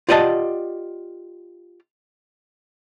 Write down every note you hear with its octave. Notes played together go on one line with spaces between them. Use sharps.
F4 G4 D5 D#5 F#5 A5